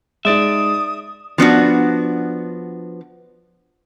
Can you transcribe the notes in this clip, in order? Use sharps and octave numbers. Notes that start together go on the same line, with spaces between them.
G#3 D#4 D5 E5 D#6
F3 B3 D4 F#4